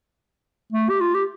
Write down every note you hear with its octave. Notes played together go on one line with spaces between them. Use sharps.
A3
G4
F4
G4